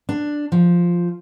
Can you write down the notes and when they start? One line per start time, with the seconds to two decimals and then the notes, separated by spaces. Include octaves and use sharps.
0.09 D4
0.52 F3